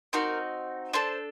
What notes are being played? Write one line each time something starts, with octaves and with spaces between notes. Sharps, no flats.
C4 D#4 F#4 A#4
D4 A4 C5